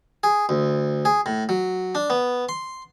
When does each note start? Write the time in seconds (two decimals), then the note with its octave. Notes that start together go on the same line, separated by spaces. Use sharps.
0.23 G#4
0.49 D2
1.05 G#4
1.26 A2
1.49 F#3
1.95 D4
2.10 B3
2.49 C6